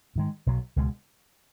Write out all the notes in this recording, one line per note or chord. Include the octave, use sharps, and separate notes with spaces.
G#2 D#3 G#3
B1 B2 F#3
C#2 B2 G#3